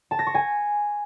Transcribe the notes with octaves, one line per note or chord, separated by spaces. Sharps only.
A5
A#6
C#6
G#5